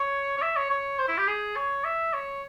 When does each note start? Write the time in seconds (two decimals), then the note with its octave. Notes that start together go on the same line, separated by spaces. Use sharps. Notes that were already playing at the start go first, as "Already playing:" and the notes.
Already playing: C#5
0.38 C#5
0.42 E5
0.56 C#5
0.70 C#5
0.99 C5
1.08 E4
1.18 G4
1.28 G#4
1.56 C#5
1.84 E5
2.13 C#5